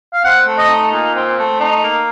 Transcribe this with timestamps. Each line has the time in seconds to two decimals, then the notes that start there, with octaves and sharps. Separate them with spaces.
0.13 F5
0.23 C4 F#5
0.46 A3
0.58 D#5
0.69 D#4
0.92 A#2
1.15 C4
1.38 A3
1.60 D#4
1.83 A#3